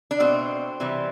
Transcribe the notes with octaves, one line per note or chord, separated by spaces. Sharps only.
D4
B2 A3 C4
C3 E3 G3